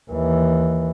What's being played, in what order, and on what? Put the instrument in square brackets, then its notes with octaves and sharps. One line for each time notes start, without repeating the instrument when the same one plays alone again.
[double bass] D#2 E3